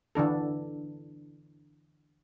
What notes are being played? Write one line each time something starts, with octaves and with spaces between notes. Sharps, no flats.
D3 E3 D4 A4